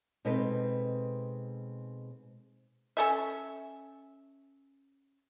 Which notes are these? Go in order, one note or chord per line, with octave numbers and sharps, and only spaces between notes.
B2 G#3 C4 D#4 A4 B4
C#4 A4 E5